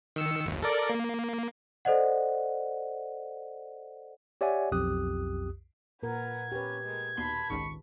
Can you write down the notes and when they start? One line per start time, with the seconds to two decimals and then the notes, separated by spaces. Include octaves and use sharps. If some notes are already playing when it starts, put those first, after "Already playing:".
0.16 D#3 E6 C#7
0.45 G1 D#2
0.63 A4 A#4 D5
0.90 A#3
1.85 A4 C5 D5 D#5 F#5
4.41 G4 C#5 D5 E5 F#5 G#5
4.72 B1 F2 G4 D#6 F#6
6.03 A#2 A#4 B4 F#5 G#6
6.52 C#4 G4 B4
6.84 G#3 A#4
7.17 D#2 B2 A5 B5 C6
7.50 G#1 C#2 D#3 C#6